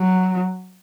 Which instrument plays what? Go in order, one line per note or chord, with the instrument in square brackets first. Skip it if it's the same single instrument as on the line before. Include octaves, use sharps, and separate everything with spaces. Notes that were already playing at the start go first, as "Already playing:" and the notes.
Already playing: [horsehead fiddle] F#3